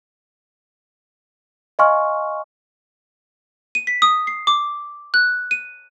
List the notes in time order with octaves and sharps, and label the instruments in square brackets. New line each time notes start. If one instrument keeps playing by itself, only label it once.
[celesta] D#5 F5 G#5 C6 C#6 F6
[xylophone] D#7
B6
D#6
C7
D6
F#6
D#7